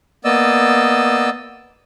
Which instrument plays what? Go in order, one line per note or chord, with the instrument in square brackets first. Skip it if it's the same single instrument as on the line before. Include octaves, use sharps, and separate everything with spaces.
[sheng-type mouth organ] A#3 B3 D5 D#5 E6